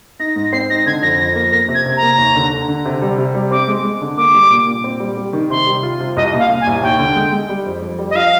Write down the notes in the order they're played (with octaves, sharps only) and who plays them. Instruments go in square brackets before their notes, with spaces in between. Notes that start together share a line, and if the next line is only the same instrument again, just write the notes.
[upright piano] D#4 [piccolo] A#6
[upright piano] G#2 [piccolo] A#6
[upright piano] C4 [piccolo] C7
[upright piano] D#4 [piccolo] A#6
[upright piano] D3 [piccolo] G#6
[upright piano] F2 [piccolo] A#6
[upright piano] F2 [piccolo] A#6
[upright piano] A#3 [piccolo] A#6
[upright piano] A#3 [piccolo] A#6
[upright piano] C3
[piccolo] G#6
[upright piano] C3
[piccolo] A#5
[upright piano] A#3
D#2
D3
D3
D3
C3
G3
C3
G3
[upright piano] C4 [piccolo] D6
[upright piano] G#3
G#3
D3
[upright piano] A#3 [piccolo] D6
[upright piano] G3
A#2
A#2
C4
G3
G3
D#3
[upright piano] C3 [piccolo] C6
[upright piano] G3
F4
C3
[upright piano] C2 [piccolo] D#5
[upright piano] A#2
[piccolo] F5
[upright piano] A#2
[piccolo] G#5
[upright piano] C2
[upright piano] D#2 [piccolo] G5
[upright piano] D3
G#3
G#3
G3
F2
F2
G3
[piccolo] D#5
[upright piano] F3 [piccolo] F5